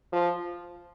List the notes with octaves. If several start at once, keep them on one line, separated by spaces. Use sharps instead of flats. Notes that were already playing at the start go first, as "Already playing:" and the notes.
F3